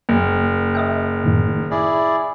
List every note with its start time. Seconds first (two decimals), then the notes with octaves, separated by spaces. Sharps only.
0.09 F#1 A#3
0.75 D#5 E5 G5
1.24 F#2 A2 D#3
1.71 E4 G#4 D5